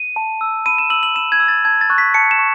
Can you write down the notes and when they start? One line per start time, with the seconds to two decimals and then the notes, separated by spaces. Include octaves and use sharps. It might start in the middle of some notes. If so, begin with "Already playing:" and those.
Already playing: D#7
0.16 A5
0.41 E6
0.66 B5 D#7
0.78 E7
0.90 E6 F#7
1.03 F#7
1.15 B5 E7
1.32 G#6
1.40 E6
1.48 A6
1.65 A5 G#6
1.81 A6
1.90 C#6 F#6
1.98 B6
2.14 A5 C#7
2.31 E7
2.39 C#6